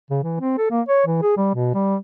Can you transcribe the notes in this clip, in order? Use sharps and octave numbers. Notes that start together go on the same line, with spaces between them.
C#3
E3
C4
A4
A#3
C#5
E3
G#4
G3
B2
G3